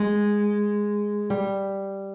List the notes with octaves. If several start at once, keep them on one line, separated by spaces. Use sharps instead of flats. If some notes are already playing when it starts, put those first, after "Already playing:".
Already playing: G#3
G3